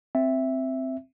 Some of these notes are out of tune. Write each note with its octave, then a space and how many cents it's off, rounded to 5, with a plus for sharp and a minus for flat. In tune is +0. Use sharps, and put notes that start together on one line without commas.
C4 +0 E5 +0